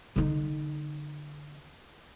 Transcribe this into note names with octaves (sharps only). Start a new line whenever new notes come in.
D3 D#4